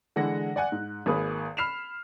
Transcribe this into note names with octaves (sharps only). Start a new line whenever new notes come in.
D3 E3 G#3 F#5 A#6
D5 F#5 G#5 F#6
G#2
G#1 A#3 G#4 B4
B5 F6 C7 E7 F7